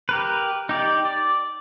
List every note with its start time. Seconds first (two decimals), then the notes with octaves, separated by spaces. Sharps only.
0.09 G4 A#4 B4
0.69 D#4 G4 D5
1.05 D5